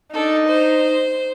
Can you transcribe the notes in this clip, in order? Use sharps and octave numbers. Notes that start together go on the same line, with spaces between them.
D4 D#4 A4
C5